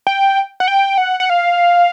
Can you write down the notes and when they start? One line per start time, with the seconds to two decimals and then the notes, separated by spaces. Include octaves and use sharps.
0.07 G5
0.60 F#5
0.68 G5
0.98 F#5
1.20 F#5
1.30 F5